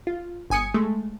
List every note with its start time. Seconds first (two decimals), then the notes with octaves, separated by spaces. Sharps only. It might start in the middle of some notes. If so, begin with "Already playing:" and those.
0.07 F4
0.50 G1 G#5 D#6 C#7
0.74 G#3 A3